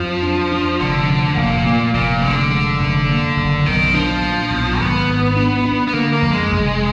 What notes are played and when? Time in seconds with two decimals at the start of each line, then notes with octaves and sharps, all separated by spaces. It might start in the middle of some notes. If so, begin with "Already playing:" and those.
Already playing: F2 F3 F#3
0.22 D4
0.52 D4
0.80 F1 D3
1.09 F2
1.37 F1 A#2
1.66 A#3
1.94 F1 A#2
2.22 F1 D3
2.51 G#3
2.80 F1
3.09 A#3
3.37 F#1
3.66 B1 D#3
3.94 F3 D4
4.22 A#2
4.50 B1
4.80 G#1 B3
5.08 G#2
5.36 D4
5.65 D4
5.87 B3
5.93 D3 A#3
6.13 A#3
6.22 F2
6.32 G#3
6.51 F1